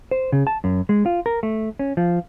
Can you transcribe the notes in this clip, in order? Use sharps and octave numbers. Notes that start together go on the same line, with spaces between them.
C5
C#3
A5
F#2
G#3
F4
A#4
A3
C#4
F3